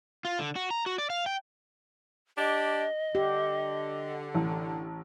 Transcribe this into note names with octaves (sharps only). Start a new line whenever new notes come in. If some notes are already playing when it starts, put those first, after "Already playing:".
F4
D3
F#4
A#5
F#4
D5
F5
G5
D4 G4 D#5
D3 G4
A1